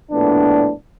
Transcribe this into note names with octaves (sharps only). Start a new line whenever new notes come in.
A#1 A2 B3 D4